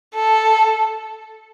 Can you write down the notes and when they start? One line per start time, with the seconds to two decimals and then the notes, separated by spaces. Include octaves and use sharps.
0.15 A4